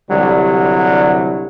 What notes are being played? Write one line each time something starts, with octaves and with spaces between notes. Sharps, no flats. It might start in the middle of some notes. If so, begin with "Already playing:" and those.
C2 D3 F#3 G3